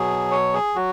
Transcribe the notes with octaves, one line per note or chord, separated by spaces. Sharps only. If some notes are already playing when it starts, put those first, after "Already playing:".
Already playing: B2 F#3 G#4
C#5
G#4
F#3 F#4